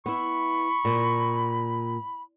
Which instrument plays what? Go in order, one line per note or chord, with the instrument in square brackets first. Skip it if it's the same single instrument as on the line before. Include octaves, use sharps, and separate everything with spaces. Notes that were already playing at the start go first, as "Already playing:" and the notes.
[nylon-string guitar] B3 E4 [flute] B5 [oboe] C#6
[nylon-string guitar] A#2